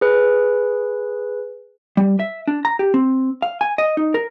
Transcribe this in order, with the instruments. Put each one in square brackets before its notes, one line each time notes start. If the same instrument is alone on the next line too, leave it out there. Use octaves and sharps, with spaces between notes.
[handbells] G#4 B4
[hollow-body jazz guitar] G3
E5
D4
A#5
G4
C4
F5
G#5
D#5
D#4
A#4